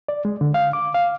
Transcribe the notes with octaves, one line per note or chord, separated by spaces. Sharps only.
D5
G#3
D3
F5
D6
F5